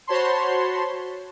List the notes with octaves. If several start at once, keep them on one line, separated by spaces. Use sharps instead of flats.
F#4 C5 C#5 A5 B5 C6